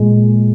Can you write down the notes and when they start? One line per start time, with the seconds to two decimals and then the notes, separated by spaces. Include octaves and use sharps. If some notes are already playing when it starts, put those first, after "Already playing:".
Already playing: A#2 G#3